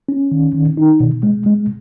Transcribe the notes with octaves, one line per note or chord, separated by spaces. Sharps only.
C#4
D#3
D#3
D#4
B2
G#3
G#3